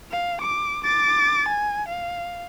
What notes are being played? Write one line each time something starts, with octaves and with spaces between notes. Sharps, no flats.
F5
D6
D6 A6
G#5
F5